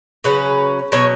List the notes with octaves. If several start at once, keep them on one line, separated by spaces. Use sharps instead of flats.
C#3 F#3 C#4 B4
B2 F#3 C#4 C#5